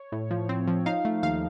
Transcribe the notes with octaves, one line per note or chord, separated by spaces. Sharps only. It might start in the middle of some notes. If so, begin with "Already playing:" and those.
Already playing: C#5
A2
F3
C4
F3
D#4 F5
A3
D#2 F5